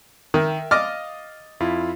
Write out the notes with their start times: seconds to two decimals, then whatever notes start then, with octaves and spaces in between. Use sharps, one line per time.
0.34 D#3 A#4 E5 G5
0.71 D#5 F5 D6 F6 A6
1.60 F2 E4 F4